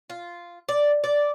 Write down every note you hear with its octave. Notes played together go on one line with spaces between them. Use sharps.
F4
D5
D5